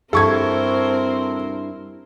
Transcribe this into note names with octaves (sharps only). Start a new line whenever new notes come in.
G2 C4 E4 A4 A#4 C5 C#6 G#6